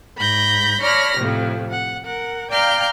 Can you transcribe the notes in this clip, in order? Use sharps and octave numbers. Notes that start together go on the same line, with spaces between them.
G#2 B5 G6 A#6
C#5 D5 A5 B5 F6 A#6
F2 A2 C3 F3
F#5
A#4 F#5
D5 F5 G5 A#5 F6 G6